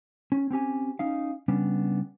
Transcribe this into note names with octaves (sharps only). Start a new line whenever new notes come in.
C#4
C4 C#4 G4 G#5
C#4 D#4 F5
C#3 G3 B3 C#4 D4